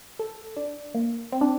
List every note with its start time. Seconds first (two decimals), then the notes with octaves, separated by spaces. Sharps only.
0.19 A4
0.57 D4
0.95 A#3
1.32 C4
1.41 D4